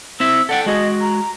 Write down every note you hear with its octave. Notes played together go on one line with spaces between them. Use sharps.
C4 E4 E5 E6
A4 D5 F#5 G5
G#3 F#4 G#4 D#5
A#5